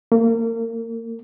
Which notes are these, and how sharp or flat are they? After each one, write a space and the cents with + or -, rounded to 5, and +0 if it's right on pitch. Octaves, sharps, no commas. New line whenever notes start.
A#3 -30